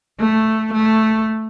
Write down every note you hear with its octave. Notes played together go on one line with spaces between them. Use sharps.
A3
A3